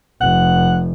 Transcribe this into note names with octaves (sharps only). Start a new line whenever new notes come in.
F1 F#5